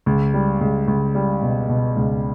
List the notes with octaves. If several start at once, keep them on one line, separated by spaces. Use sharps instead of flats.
C#2
G3
C#2
C#2
G3
B2
B2
C#2